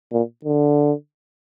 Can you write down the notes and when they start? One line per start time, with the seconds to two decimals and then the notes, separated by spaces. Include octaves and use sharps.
0.12 A#2
0.44 D3